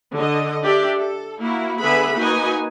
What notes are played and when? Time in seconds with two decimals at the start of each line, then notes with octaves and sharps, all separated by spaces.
0.14 D3 D#5
0.62 D4 G4 D5 E5
0.98 A4
1.41 A#3 E4 F#4
1.81 D3 B3 G#4 B4 E5 B5
2.17 A#3 D#4 F#4 B4 D#5 G#5